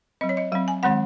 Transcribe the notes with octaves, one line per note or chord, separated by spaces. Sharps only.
F#3 C4 D#5
C#5
D#5
F#3 C4 F5
G#5
D#3 G#3 C4 F#5